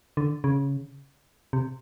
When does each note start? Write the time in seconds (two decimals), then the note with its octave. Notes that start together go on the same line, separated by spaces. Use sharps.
0.17 D3
0.44 C#3
1.53 C3